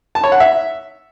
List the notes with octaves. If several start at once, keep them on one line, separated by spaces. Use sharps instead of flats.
A5
C#5
F#5
E5